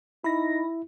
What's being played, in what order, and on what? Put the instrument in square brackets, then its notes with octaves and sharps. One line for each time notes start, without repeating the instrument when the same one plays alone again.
[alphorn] D#4 [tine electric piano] E4 [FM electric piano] B5 A#6